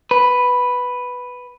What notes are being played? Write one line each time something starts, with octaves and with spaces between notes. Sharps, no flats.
B4